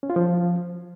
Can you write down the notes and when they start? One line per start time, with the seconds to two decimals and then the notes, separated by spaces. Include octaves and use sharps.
0.03 C#4
0.10 F4
0.16 F3